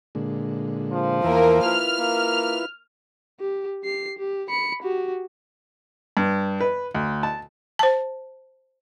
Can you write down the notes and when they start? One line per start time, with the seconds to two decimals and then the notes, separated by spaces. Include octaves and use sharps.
0.15 A#2 D3 G#3
0.92 F3
1.24 E2 E3 A#3 A#4 E5
1.66 E4 F4 B4 F6
1.99 A#3
3.40 G4
3.84 G4 C7
4.18 G4
4.50 B5 C#7
4.83 F#4 G4
6.17 G2
6.60 B4
6.94 D2
7.23 A5
7.79 C5 A5